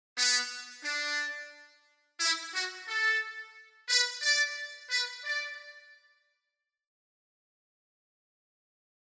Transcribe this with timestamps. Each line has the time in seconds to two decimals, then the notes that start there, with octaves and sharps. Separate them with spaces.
0.16 B3
0.84 D4
2.20 E4
2.53 F#4
2.87 A4
3.89 B4
4.22 D5
4.90 B4
5.24 D5